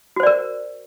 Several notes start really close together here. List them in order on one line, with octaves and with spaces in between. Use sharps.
F#4 C5 D5 A#4